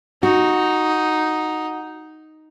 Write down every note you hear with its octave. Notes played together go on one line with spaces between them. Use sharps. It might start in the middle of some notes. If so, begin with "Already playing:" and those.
D#4 F#4